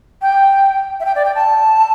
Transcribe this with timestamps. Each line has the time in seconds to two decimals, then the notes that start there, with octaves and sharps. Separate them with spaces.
0.22 G5
1.00 E5
1.05 G5
1.15 D5
1.25 G5
1.35 A5